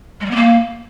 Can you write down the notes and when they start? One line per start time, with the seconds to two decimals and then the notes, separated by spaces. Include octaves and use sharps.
0.21 G#3
0.26 G3
0.31 B3
0.36 A#3